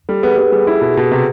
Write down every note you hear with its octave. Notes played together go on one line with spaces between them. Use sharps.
G3 A4
B3 G#4
B3 G4
G3 G#4
E4
B2
B2
C3